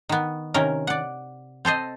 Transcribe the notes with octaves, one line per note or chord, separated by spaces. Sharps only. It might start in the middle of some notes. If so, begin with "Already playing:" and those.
D#3 B3
C3 D#3 C#4 A#4
D5 F#5
C4 A4 C5 D#5